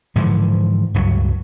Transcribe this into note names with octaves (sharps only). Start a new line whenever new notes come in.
G#2 D3 E3 F3
C#2 G2 F#3